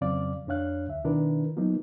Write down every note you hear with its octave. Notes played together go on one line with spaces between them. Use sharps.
F2 C#3 F#3 C4 D5 F5
F2 D4 C#5 F5 F#6
D2 E5
B2 D#3 D4 E4 A#4 B4
F3 F#3 A#3 B3 D#4